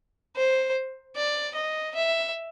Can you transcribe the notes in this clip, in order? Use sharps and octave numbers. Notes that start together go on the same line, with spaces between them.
C5
D5
D#5
E5